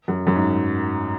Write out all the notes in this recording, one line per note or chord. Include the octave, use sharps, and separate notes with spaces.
F#2
F#2
G#2